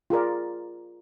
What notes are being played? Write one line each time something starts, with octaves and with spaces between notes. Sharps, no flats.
F4 G#4 A#4 D5